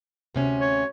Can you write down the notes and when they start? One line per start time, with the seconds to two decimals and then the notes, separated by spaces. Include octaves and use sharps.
0.34 D2 C3 C#4
0.61 C#5